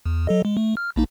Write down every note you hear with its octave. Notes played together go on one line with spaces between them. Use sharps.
E2
F#3 A4 D#5
G#3
A3
F6
A#1 A#3 D#4